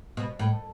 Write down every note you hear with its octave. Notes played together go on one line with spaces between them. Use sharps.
B2
A2